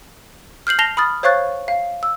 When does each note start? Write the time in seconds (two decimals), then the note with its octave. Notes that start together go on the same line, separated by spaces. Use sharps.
0.67 F6 G6 C7 F#7
0.79 A5 A#6 C7 F7 G7
0.97 B5 D#6 F6 A6
1.23 C5 C#5 F5 C#6 F#6 A6
1.68 F5
2.03 E6